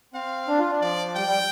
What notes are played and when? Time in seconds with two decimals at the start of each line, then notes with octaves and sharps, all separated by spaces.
0.14 C4 F5
0.48 D4
0.59 F4
0.71 D4
0.81 F3 D5
1.16 G3 G5
1.27 G3